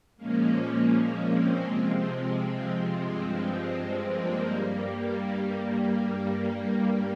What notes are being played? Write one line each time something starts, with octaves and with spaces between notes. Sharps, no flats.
A#2 F3 G#3 A#3 C#4
A#3 C#4
C4
C3 F3 G#3 C4
C4
G2 F3 G#3 C4
C4
A#3
G2 G3